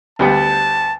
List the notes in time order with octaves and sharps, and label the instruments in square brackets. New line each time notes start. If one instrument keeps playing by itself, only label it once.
[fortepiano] D2 G3 B3 [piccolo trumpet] A5